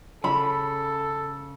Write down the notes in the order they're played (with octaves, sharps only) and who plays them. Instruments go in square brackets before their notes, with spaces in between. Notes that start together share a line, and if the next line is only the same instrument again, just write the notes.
[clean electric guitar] C#3 [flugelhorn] A4 [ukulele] B5